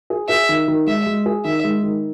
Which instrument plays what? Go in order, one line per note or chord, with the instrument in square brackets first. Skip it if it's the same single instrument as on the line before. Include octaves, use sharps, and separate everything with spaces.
[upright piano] G#4
[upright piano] G#4 [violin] E5
[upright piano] D#3
D#3
[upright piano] G#3 [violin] E5
[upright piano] G#3
G#4
[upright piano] D#3 [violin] E5
[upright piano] G#3
D#3